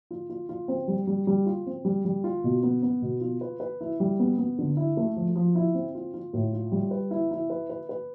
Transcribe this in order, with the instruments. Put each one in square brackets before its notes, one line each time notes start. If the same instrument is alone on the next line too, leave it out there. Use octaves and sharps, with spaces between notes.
[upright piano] F4
F4
F4
C4
G3
G3
G3
F4
C4
G3
G3
F4
B2
B3
B3
B2
F4
B4
B4
E4
G3
B3
B3
D3
E4
A3
F3
F3
E4
C4
F4
F4
A2
F4
G3
B4
E4
E4
B4
B4
B4